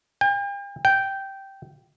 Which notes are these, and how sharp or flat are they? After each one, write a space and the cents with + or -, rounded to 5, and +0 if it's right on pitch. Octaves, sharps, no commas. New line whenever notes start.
G5 +40
G5 -10